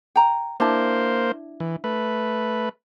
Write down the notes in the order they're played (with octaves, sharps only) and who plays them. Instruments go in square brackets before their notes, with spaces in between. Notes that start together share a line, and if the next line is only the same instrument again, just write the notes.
[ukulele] G5 A#5
[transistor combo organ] A#3 C5 [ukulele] D4 E4 A5
[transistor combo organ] E3
A3 B4